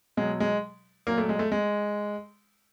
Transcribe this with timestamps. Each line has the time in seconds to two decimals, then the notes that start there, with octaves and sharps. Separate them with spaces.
0.17 B2 F#3 G#3
0.40 G#3
1.07 A#2 F#3 A#3
1.18 A3
1.29 G#3
1.39 A3
1.52 G#3